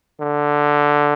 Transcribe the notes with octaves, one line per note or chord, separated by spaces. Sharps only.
D3